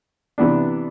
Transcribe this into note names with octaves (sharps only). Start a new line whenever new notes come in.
C3 E3 B3 D4